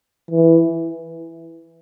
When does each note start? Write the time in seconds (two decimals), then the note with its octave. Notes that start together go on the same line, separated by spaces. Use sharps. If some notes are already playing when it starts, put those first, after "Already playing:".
0.31 E3